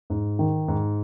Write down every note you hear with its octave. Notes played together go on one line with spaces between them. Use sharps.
G#2
D#3
G#2